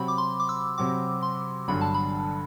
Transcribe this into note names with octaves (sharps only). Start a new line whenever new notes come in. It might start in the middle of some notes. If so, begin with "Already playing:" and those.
Already playing: C3 F#3 C4 F#4 B5
D6
C6
D6
E6
C3 F#3 C4 F#4 D6
C6
G1 G2 D3 F#3 B5
A5
B5